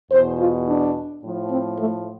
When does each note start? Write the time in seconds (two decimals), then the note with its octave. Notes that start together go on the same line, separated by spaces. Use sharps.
0.10 E2 C5
0.14 B2
0.38 F4
0.66 D4
1.23 A2 F3
1.51 C4
1.78 A3